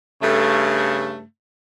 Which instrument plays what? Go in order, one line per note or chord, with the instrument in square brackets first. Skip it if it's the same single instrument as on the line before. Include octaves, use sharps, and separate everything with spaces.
[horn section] G2 C#3 A3